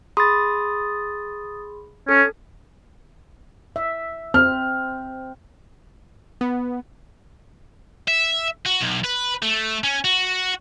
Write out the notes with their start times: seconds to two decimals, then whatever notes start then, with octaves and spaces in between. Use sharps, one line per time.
0.17 G#4 B5 C6 D#6 A6
2.09 C#4 A4
3.76 E5
4.34 C4 F6
6.41 B3
8.08 E5
8.65 F#4
8.81 B1
9.04 B4
9.43 A3
9.84 C#4
10.05 F#4